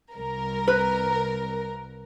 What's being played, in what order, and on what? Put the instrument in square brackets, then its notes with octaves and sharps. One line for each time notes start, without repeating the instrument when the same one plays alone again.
[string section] C2 A#4
[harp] B4